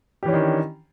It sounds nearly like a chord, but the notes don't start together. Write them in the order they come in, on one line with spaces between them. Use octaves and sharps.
G4 E3 C#4 D4 D#3